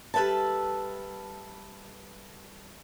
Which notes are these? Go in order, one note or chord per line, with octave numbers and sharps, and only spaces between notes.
G3 A4 B4 E5 A5